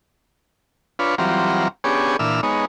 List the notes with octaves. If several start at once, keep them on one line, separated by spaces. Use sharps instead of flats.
D4 F4 B4 C#5
E3 F#3 G3 C4 F4 A#5
B3 C#4 D4 G4 G#4 C#5
A#2 E3 D4 E6 F6
G#3 B3 D#4 C#5